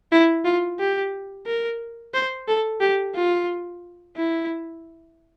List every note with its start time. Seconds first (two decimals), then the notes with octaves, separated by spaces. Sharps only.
0.12 E4
0.45 F4
0.79 G4
1.47 A#4
2.14 C5
2.48 A4
2.81 G4
3.15 F4
4.16 E4